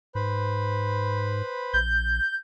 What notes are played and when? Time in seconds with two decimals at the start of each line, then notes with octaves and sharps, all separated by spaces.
0.15 G#2 B4 C5 B5
1.73 A#1 G6